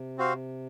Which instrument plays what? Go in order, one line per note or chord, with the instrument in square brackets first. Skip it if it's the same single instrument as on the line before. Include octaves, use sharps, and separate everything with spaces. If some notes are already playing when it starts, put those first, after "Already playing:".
Already playing: [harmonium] C3
[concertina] C4 F#4 C5 F5